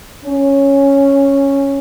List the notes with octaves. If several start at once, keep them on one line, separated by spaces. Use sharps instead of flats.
C#4